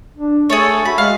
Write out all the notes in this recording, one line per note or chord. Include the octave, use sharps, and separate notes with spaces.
D4
A3 G#4 A4 C#5
F#4 B5
G#3 F5